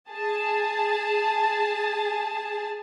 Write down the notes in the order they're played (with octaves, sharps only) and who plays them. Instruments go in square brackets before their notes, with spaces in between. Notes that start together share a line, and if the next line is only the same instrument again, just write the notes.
[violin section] G#4 A5